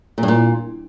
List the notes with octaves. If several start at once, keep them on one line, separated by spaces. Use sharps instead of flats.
A#2
G2
A#2